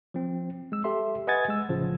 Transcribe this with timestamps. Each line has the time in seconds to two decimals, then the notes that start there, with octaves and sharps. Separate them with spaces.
0.14 F3 C4
0.72 G#3 E6
0.84 G4 A4 E5 C6
1.27 B4 D#5 F#5 G#5 G#6 A6
1.48 G#3 E6
1.68 B1 A2 C#3 F3